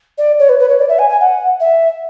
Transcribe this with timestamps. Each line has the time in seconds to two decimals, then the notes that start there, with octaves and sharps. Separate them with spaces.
0.18 D5
0.39 C#5
0.49 B4
0.59 B4
0.69 C#5
0.78 D5
0.88 E5
0.98 G#5
1.09 G#5
1.20 F#5
1.60 E5